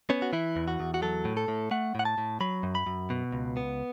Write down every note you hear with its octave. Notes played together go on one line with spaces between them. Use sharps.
B3 C#4
F#4
E3 E4
E2
F#4
E2
F#4
F#3 A4
A2
A4
A2
A3 F#5
A2 F#5
A5
A2
F#3 B5
F#2
B5
F#2
B2
C#2
B3